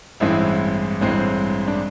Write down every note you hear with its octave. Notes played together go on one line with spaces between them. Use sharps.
A1 G2 E3 G#3 C4 E4
A1 G2 E3 G#3 C4
D4